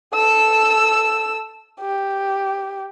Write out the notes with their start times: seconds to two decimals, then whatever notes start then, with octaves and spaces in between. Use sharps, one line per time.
0.14 A4 E6
1.81 G4